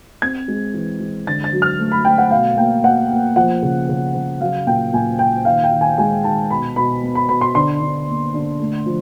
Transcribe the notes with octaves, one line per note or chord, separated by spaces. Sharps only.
C4 G#6
G#3
E3
G#3
D3 A6
A6
F#3
F6
A3
B5
A3 G5
F#5
B2 F5
A#3 G5
A#3 F#5
A#3
F3 F#5
C#3
C#3
C#3
F#3 F5
A#2 G5
A#2 G#5
A#2 G5
D#3 F5
G5
D#3
G#5
G#3 G#5
D#3 A5
B2 B5
B2 B5
B3
B5
B2 B5
C6
D3 C6
D3
A#3
D3
A3
F3